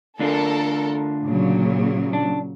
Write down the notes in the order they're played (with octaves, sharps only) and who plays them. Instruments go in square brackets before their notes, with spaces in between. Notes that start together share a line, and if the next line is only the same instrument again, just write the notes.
[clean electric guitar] D2 D4 F4 [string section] A4 A#4
[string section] A#2 C#3 F#3
[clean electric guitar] D4